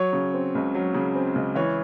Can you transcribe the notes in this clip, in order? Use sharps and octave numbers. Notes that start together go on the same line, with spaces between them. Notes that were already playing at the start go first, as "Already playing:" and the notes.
Already playing: F#3 C#5
C#3
C4
C#2
F#3
C#3
C4
C#2
E3 C#5